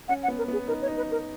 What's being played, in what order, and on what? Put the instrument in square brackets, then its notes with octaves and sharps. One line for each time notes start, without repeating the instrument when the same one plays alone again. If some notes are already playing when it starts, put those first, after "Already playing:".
[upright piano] C#4 [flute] F#5
[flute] F#5
[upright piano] B3
[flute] A#4
[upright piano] B3 [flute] G#4
[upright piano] D#4 [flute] A#4
[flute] C#5
[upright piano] D#4
[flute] B4
A#4